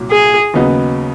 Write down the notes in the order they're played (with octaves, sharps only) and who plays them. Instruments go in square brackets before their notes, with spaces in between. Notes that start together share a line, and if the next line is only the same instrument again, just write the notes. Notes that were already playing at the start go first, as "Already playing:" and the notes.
Already playing: [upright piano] C2 A#2 F#3
[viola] G#4
[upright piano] D#2 C#3 F#3 B3 D#4